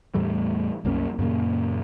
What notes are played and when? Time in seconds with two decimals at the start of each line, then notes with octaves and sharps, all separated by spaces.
0.14 E2 A2 G3 A3
0.85 C2 F#2 A#3 C#4
1.19 F#2 A#2 C#3 A#3